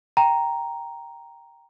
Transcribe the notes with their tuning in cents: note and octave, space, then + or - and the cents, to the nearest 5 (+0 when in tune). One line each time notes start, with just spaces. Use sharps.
G5 +0 A#5 +0